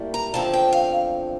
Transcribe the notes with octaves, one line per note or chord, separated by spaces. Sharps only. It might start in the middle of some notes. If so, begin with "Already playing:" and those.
Already playing: A2 G3 A#3 E4
A#5
E2 D3 F3 C4 A5
G5
F5